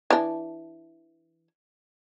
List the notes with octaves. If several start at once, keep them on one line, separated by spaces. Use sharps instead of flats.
E3 D4